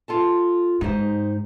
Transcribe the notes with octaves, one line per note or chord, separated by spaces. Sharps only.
F4 A4 A5
G#2 D#4 G4 C5